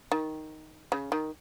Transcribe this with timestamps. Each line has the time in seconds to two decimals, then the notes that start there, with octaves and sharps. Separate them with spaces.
0.12 D#3
0.92 C#3
1.12 D#3